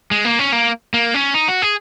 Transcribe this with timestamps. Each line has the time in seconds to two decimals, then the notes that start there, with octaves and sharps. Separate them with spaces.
0.11 G#3
0.25 A#3
0.39 C#4
0.52 A#3
0.94 A#3
1.14 C#4
1.34 D#4
1.48 F#4
1.62 G#4